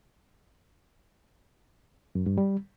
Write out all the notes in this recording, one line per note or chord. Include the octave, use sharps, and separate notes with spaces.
F#2
G2
G3